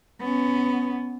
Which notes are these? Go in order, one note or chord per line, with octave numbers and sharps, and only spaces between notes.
B3 C#4